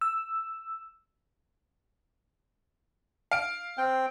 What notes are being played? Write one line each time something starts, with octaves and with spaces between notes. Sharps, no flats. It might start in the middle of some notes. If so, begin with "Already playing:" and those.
E6
F5 D7
C4 G5